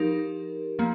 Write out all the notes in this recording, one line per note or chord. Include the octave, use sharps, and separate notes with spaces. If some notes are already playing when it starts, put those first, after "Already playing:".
Already playing: F3 D#4 G4 A#4
F3 A#3